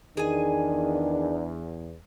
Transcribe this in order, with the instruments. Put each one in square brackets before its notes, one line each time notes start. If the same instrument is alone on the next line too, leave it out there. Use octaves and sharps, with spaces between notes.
[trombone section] E2 [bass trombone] D#3 [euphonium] D4 [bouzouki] G#4 G#5